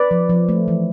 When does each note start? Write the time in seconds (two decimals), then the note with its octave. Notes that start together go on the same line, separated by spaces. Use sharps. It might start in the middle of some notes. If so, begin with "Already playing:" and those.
Already playing: B4 D5
0.11 F3
0.29 F3
0.49 A3
0.68 E3